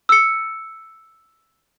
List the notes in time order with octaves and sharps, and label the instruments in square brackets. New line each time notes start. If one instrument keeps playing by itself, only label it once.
[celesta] E6 C#7